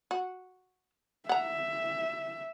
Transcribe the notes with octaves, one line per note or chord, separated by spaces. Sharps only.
F#4
E5 F#5 A#5